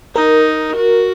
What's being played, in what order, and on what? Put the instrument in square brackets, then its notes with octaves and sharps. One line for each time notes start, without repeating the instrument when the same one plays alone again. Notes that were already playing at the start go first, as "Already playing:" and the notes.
[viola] D#4 [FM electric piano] A#4
[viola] F#4